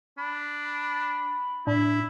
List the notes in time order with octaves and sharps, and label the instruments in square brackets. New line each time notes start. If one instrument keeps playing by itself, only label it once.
[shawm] D4 [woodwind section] B5
[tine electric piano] A2 [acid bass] D4 [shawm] E4